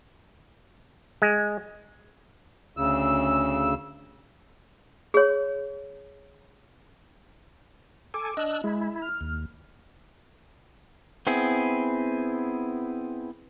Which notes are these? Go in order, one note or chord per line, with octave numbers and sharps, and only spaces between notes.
G#3
D2 C#3 E6
G#4 C#5
A4 G#5 D6
D4 D#5 E6 F#6
G#3 E4
F6
D#2
B3 C4 E4 G#4